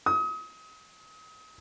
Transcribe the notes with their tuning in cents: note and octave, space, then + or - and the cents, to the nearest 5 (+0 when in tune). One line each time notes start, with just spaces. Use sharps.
D#6 +35